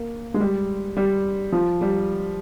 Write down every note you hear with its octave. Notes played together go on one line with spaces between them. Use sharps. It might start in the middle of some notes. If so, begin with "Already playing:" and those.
Already playing: A#3
G#3
G3
G3
F3
G3